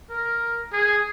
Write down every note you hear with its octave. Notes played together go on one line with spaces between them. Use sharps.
A#4
G#4